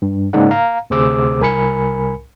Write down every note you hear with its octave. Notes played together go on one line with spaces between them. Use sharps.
G2
G#2 C#3 A#3 D#4 D5 F#5
F5 A#5
D2 C3 G#4 C5 D6 E6
C2 A#4 G#5 B5 C#7